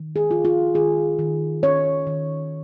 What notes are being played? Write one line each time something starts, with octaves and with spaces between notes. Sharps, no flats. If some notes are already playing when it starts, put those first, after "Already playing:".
Already playing: D#3
G#4
F4
F4
D#3 G#4
D#3
C#4 C#5
D#3